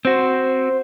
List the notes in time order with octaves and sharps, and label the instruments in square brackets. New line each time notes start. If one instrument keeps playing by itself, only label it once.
[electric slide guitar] C4 F#4 [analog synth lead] C5